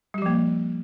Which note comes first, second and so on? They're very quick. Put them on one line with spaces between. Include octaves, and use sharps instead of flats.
G3 G4 F3 A#3